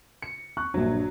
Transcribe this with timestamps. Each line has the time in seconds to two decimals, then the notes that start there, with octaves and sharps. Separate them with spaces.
0.22 C#7
0.57 C#6 F#6
0.74 A#1 G2 F#3